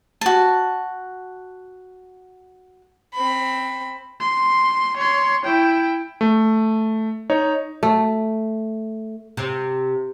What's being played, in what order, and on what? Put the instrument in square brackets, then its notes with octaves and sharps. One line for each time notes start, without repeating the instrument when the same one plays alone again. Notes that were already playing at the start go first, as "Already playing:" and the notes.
[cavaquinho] F#4 A5
[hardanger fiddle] C4 B5
[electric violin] C6
C#5 C6
E4 G5
[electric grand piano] A3
D#4 C#5
[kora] A3
[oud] C3